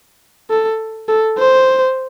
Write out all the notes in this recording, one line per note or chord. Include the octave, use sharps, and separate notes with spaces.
A4
A4
C5